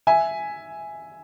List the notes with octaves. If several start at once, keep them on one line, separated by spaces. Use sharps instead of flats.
E5 G#5